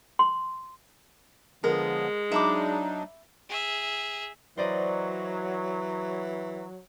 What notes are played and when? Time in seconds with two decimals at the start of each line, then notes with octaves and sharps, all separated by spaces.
0.19 C6
1.64 D3 F3 G#3 B3 A#4
2.32 F#3 D4 D#4 E5 B5 D6
3.49 G#4 E5
4.57 E3 F#3 C5 D5 D#5